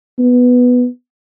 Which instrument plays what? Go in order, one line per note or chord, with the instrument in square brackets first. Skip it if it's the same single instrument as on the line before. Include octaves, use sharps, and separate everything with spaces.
[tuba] B3